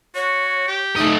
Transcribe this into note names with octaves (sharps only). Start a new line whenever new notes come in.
F#4 C#5
G4
A3 D#4 D#5